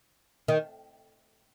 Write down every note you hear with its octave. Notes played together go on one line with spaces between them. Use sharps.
D#3